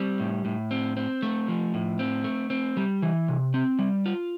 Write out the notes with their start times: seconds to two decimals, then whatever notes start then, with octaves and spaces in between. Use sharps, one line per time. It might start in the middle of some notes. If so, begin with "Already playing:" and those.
Already playing: G3 C4
0.20 A2
0.45 A2
0.71 C4
0.97 C4
1.23 A3
1.48 F3
1.74 A2
1.99 C4
2.24 A3
2.50 C4
2.77 G3
3.02 E3
3.28 C3
3.54 C4
3.79 G3
4.06 F4